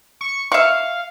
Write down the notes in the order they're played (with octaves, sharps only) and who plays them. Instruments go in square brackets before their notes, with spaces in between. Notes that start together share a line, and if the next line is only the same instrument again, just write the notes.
[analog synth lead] C#6
[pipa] E5 C#6 [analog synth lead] F5